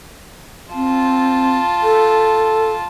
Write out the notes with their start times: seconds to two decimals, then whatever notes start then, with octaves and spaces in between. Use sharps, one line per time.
0.74 C4 F4 A5
1.83 A4